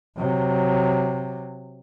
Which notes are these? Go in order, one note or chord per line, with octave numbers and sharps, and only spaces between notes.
C3 F#3